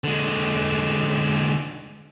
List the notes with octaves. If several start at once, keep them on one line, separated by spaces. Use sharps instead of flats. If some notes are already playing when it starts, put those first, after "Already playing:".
D3 G#3